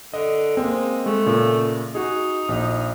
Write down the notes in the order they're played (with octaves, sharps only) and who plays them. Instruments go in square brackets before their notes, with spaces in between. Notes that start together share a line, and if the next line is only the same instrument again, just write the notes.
[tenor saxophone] D3 [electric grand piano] D#5
[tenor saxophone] G#3 [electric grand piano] A#3 C4
[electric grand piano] G#3 [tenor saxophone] A3
[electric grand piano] A#2 C#3
[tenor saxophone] D#4 [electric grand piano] F#4 G#4
[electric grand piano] A#1